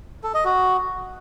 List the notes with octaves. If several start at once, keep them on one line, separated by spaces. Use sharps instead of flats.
A4
D#5
F#4